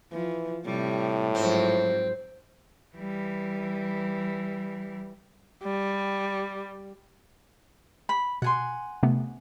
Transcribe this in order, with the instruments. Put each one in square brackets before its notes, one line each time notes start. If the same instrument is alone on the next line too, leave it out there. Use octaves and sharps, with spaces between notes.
[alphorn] E3 [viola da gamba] F3
[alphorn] A2 [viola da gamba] C3 G3
[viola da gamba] G#2 F3 F#3 [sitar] C4
[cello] E3 G3
[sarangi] G3
[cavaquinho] B5
[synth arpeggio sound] B2 [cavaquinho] F#5 G#5 C6
[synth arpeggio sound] C3 A3 B3